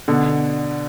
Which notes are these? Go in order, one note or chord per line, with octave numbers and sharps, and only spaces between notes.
B2 D3